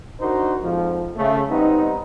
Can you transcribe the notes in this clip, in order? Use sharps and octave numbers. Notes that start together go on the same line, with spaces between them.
D4 D#4 F#4 A#4 C5
F2 G#2 F3
C#3 A3
G3 B3 C4 D#4